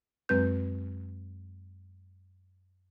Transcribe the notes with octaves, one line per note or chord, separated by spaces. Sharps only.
F#2 F#3 G#3 C4 B4 G6